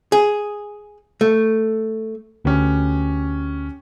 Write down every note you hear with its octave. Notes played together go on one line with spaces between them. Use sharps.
G#4
A3
D2 C#4 G4 B4